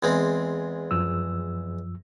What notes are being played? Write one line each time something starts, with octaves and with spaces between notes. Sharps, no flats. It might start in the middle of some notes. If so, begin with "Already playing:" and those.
E2 G#3 C4
F#2 F3 E6